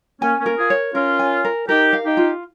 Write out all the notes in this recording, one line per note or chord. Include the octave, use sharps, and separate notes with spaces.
A#3 C#4 G#5
A#3 C#4
A#4
F4 G#4
C#5
C#4 F4 A#4
G#5
A#4
D#4 G4 A#4
F5
D#4 G4
F4